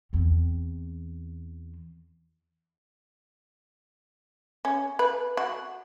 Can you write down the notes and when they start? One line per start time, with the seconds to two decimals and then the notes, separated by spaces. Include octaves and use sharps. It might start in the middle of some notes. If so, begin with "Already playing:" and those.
0.13 E2 C4
4.65 C#4
4.99 B4
5.37 F#4